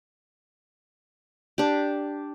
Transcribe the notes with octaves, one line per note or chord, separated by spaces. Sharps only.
D4 G4